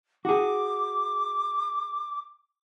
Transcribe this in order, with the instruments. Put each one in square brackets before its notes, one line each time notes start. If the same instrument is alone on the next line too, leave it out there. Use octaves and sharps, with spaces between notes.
[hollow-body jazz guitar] F#4 G#4 [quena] D6